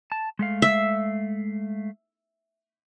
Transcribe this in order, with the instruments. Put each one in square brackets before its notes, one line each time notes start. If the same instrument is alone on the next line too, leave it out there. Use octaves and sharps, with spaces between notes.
[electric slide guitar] A5
G#3 A3 F5
[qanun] E5